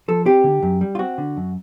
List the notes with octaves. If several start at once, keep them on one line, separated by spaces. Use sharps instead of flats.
F3 A4
C4 G4
D3
F#2
G3
F4
C4 F#4
D3
F#2